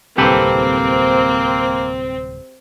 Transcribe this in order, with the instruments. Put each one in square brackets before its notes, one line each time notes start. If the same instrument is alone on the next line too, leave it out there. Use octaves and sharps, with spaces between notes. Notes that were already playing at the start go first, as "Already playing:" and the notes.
[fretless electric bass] D1 C2 [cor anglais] A#3 [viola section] C4 [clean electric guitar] G4 A4 B4